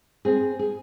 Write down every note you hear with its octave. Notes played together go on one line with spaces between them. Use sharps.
C4 G#4
G#4